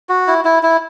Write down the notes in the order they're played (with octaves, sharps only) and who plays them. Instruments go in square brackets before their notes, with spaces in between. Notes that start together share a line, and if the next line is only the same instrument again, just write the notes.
[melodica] F#4
E4
E4
E4